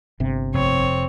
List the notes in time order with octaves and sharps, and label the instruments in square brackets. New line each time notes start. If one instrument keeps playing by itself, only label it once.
[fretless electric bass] G1 C3
[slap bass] F1 [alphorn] C4 [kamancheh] C#5